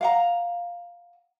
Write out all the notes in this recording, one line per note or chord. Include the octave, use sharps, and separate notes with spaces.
F5 F#5 A#5